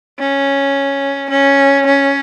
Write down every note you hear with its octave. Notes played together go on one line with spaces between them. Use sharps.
C#4
C#4
C#4